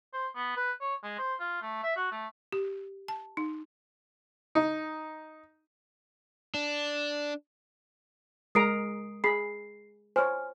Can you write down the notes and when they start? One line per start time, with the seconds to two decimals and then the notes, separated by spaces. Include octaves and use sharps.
0.14 C5
0.36 B3
0.56 B4
0.81 C#5
1.04 G#3
1.19 C5
1.40 F4
1.62 A3
1.84 E5
1.96 F#4
2.12 A3
2.52 G4
3.08 A5
3.37 D#4
4.55 D#4
6.54 D4
8.55 G#3 A#4 A#5 D#6 C7 D7
9.24 G#4 B5 C7
10.16 C5 C#5 G#5 F6